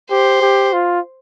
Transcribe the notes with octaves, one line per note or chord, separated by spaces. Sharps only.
G4 C5
G4
F4